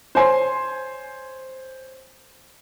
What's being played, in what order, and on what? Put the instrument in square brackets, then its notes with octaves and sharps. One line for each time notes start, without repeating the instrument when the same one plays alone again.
[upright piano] C5 C#5 G#5 C6